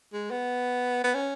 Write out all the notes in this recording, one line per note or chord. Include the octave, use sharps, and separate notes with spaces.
G#3
B3
B3
C#4